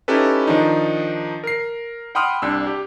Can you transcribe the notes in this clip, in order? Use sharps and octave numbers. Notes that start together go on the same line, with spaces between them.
C#4 D#4 E4 G4 A4 B4
D#3 F3 D4 D#4
A#4 C7
F#5 G5 B5 C6 D#6 F6
C2 D4 E6
G4